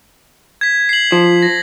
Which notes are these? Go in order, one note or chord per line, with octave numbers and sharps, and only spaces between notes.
G#6 B6
C7 F#7
F3
A#6